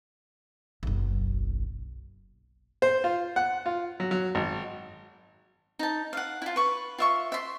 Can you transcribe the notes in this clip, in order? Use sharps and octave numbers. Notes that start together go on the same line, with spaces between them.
F#1 B1
C5
F4
F#5
F4
F#3
F#3
G#1
D#4 A5
F5 F#5
E4 F4
B4 C#6
F4 E5 C#6
E5 C6